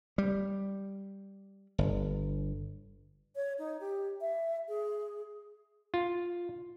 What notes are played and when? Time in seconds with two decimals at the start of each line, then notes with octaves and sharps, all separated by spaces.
0.18 G3
1.78 G1
3.36 C#5
3.59 D#4
3.81 G4
4.21 E5
4.68 G#4
5.94 F4